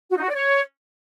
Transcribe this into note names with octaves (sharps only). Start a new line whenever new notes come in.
F#4
D#4
F#4
D5
C#5